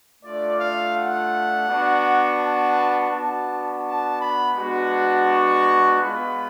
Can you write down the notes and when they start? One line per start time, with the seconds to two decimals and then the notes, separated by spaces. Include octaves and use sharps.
0.22 A3 D4 F4 D5
0.58 F5
0.95 F#5
1.67 B3 D4 F#4
2.38 A5
3.11 B3 D4 F#4 A5
3.83 A5
4.19 B5
4.55 G#3 B3 D4 F#4
5.27 C#6
5.99 G#3 B3 F4 B5